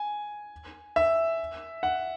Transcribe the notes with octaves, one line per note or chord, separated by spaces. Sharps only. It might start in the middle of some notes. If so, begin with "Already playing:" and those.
Already playing: G#5
E5
F#5